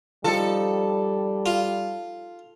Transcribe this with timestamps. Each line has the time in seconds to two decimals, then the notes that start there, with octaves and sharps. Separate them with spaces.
0.24 F3 G3 D#4 A4
1.46 F4